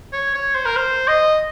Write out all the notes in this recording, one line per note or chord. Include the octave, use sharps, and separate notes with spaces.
C#5
C#5
C5
A#4
C5
D#5